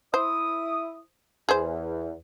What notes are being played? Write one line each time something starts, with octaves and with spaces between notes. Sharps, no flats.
E4 C5 D#6
E2 G#4 C5